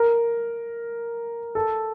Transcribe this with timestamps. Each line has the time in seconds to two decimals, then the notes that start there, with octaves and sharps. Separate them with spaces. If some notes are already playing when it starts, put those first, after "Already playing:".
Already playing: A#4
1.55 A4